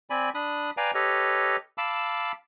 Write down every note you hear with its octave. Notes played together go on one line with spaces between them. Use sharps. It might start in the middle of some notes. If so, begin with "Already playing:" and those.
C4 D5 G#5 B5
D4 B5 D#6
B4 D5 F5 G5 G#5 A#5
G4 A4 B4 C#5 D#5 F6
F5 A5 B5 D6 E6